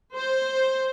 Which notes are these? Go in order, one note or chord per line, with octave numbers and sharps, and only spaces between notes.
C5